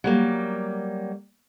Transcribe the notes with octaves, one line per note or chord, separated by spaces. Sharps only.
F#3 G3 A#3